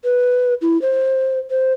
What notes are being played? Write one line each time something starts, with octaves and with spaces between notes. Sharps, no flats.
B4
E4
C5
C5